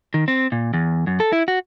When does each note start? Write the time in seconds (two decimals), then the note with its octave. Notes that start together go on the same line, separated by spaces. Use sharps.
0.14 D#3
0.28 C4
0.52 A#2
0.74 E2
1.07 F#2
1.20 A4
1.32 E4
1.48 F#4